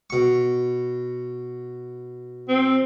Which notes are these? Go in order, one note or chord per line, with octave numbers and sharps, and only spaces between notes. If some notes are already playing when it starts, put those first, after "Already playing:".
B2 C#6
C4